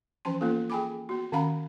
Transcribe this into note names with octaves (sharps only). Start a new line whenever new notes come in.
E3 F3 C#4 A5 C6
A#3 B3 C#4 F4 A4
G#4 G5 G#5 B5 D6
B3 F#4
D#3 C#4 F5 F#5 A#5 B5